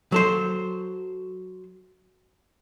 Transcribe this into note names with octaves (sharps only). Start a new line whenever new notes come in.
F#3 A4 C5